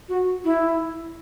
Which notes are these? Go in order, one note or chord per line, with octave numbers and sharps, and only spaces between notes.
F#4
E4